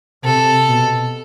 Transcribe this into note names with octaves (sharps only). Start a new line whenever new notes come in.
C3 A4
B2